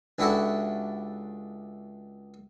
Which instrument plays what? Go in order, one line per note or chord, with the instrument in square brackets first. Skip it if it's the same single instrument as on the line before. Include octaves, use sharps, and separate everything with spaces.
[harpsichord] C#2 D4 E4 F#4 G4 A4